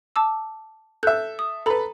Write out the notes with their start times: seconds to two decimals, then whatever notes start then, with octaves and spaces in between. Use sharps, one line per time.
0.16 A5 D6 E6
1.03 A4 E5 F#6 G6
1.39 D#6
1.66 A4 B4 A#5 B5